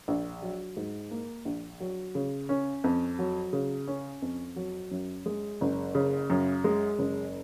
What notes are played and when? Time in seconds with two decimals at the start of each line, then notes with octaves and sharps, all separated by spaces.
0.08 A#1
0.42 F#3
0.77 G#2
1.11 A#3
1.45 A#1
1.80 F#3
2.15 C#3
2.49 C#4
2.84 F2
3.19 F#3
3.53 C#3
3.88 C#4
4.22 F2
4.56 F#3
4.91 F#2
5.26 G#3
5.61 F#1
5.95 C#3
6.30 F#2
6.64 G#3
6.99 F#1